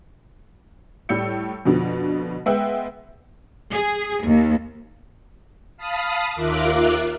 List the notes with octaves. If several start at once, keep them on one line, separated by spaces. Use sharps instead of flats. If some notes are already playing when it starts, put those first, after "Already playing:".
A2 G3 E6 G6 C#7
F2 B2 D3 F3
G#3 B3 E5 F#5 G5 E6
G#4
D#2
F5 A5 B5 D#6
D#2 F4 A#4 E5 D6 F#6